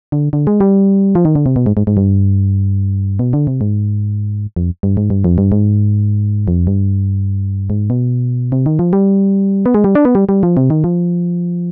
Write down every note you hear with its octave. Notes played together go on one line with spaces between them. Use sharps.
D3
D3
G#3
G3
F3
D#3
D3
C3
B2
G#2
G#2
G#2
G2
B2
D3
C3
G#2
F2
G2
G#2
G2
F2
G2
G#2
F2
G2
G#2
B2
C3
D#3
F3
G3
B3
G#3
G3
D4
B3
G3
G3
F3
C3
D#3
F3